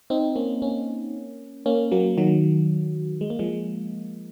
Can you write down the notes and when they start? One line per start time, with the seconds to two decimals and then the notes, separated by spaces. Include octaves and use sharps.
0.10 C4 D#4
0.36 A#3 C#4
0.62 A#3 C#4
1.66 A#3 C#4
1.92 F#3 A#3
2.18 D#3 F#3
3.21 G#3
3.30 A#3
3.39 F3 G#3